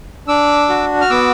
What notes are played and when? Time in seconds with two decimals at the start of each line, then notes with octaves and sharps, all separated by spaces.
0.28 D4 D6 E6
0.69 F#4
1.01 F6
1.10 B3 D6 E6